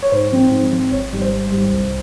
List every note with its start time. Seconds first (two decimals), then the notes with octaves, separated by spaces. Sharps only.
0.02 C#5
0.12 G#2 C5
0.32 F3 C4
0.52 G#2
0.72 F3 C4
0.91 G#1 C#5
1.12 G#2 G3
1.22 C5
1.32 G#1
1.52 G#2 G3
1.71 C2